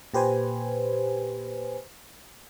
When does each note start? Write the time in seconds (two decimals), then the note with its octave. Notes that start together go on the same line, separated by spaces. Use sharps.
0.14 A#2 G4 B4 C5 G#5